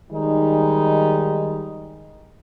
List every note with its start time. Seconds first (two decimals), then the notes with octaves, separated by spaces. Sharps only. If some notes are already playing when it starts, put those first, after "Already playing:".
0.11 D#3 G3 G#3 D#4